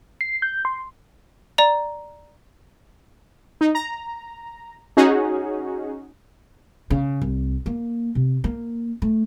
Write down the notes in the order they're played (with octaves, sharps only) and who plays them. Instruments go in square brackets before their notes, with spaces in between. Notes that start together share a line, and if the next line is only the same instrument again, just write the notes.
[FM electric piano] C7
G6
C6
[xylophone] D5 A#5
[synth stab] D#4
A#5
C#4 D#4 F#4 G#4
[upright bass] C#3
C2
A#3
C3
A#3
A3